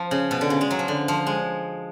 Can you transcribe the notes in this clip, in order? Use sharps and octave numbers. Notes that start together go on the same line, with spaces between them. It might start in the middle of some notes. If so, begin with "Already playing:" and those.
Already playing: F3
C#3
B2
D3
C#3
G#3
F#3
F3
D3
F3
G#3